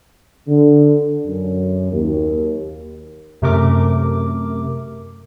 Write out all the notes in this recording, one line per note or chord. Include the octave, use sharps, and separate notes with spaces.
D3
F#2
D#2
F#2 C3 A3 A#4 D6